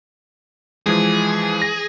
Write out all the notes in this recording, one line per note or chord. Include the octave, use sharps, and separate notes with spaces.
E3 F3 G#3 G#4
A#6